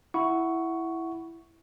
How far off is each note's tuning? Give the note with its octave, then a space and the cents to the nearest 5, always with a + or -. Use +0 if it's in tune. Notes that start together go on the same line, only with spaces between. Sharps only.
E4 +0 F#5 +0 C#6 +5